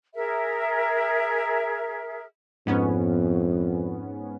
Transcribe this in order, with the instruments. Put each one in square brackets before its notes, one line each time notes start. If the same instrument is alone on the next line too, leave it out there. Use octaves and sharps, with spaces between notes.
[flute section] G#4 A#4 E5
[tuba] F2 [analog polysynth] G#2 B3 C#4